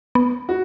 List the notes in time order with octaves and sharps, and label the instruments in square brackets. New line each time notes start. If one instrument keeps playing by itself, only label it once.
[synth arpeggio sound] B3
[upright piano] F#4